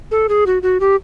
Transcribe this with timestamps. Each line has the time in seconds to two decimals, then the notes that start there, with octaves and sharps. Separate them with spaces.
0.11 A4
0.29 G#4
0.46 F#4
0.63 F#4
0.80 G4